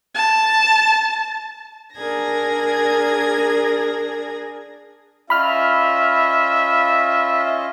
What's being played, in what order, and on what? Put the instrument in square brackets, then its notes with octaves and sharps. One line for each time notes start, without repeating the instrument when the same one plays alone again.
[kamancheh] A5
[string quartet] D4 G#4 A#4 G#6 A#6
[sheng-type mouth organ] C#4 F4 D#5 [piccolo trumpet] E5 [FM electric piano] B5 F6